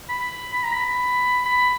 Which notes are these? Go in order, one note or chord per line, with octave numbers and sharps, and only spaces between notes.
B5
B5
A#5
B5
B5